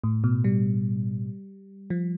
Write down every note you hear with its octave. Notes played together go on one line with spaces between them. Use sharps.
A2
B2
G3
F3